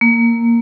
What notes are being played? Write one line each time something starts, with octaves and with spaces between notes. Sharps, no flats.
A#3